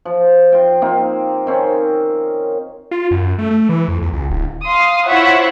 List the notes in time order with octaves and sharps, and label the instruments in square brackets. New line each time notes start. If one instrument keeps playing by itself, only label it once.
[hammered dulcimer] F3
F4 G5
A#3 C4 D#4 F4
D#3 C4 C#4
[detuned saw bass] F4
F#2
A3
A3
E3
F2
E2
C#2
D1
[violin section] F5 C6 D#6
E4 F4 C5 C#5 E5 F#5